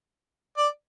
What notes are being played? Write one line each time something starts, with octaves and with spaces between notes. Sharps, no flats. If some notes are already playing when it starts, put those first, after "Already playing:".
D5